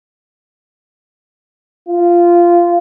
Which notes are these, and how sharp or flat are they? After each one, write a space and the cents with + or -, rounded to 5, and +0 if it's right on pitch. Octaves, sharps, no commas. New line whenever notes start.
F4 -10